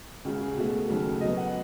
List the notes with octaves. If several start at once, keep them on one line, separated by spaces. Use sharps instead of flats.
C#2 C#3 G#3 F#4
G#4
B2 A3 F#4
D#2 C#3 F#3 A3
B2 F#3 B3 D#5
F#5